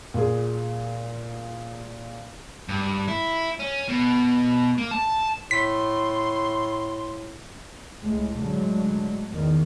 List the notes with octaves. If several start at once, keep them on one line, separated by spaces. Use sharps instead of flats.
A#2 G#4
G2
E4
C#4
B2
A#3
A5
A2 C6 B6
C#2 A2 G#3
A2 D3 F#3 G#3
E2 D#3